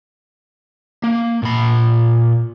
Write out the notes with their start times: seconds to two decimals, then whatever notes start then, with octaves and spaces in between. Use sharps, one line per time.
1.04 A#3
1.43 A#2 B5